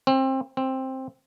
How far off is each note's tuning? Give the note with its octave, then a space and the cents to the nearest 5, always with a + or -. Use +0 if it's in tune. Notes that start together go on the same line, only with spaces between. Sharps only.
C4 +25
C4 +10